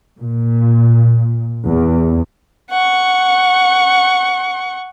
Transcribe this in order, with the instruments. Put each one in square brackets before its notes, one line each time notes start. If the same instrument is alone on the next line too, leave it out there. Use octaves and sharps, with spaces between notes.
[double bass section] A#2
E2
[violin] F#5 C#6